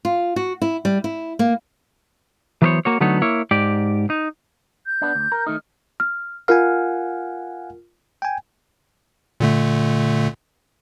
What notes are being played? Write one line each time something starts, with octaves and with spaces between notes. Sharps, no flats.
F4
F#4
E4
G3
E4
A#3
E3 F#3 B3 A#4 C5 C#5
A#3 F#4 C#5
D3 F#3 A3 B3 D#4 C#5
A#3 E4 C#5
G#2 G4 D5
D#4
G6
B3 D4
D2
A#4
D#3 A3 D#4 F6
F6
F4 A#4 F5 F#5 G#5 F6
G5 G#5
A#2 D3 A3